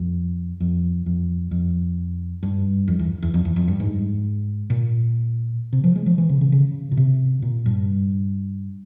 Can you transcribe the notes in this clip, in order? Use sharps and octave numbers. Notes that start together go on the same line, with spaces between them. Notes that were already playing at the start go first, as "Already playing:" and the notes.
Already playing: F2
F2
F2
F2
G2
F2
E2
E2
F2
E2
F2
G2
G#2
A#2
C3
F3
G#3
F3
E3
C#3
C#3
C#3
A#2
C3
A#2
G2